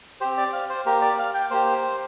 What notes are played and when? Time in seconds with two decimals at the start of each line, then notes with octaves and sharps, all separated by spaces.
0.21 C4 G4 C5
0.38 D5
0.53 F5
0.70 C5
0.86 A#3 G4 A#4
1.02 D5
1.19 F5
1.34 G5
1.51 A#3 G4 C5